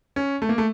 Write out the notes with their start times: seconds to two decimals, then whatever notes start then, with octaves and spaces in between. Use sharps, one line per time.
0.16 C#4
0.42 A3
0.49 A#3
0.58 A3